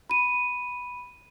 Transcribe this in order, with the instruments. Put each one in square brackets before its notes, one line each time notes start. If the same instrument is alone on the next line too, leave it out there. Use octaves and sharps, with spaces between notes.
[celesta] B5 D#7